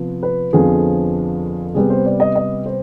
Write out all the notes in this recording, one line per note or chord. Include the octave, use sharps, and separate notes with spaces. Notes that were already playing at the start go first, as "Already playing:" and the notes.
Already playing: C3 F3 B3
B4
F2 D3 F3 B3 G#4
C3 G3 B3 G#4
C5
D5
D#5
D#5
C5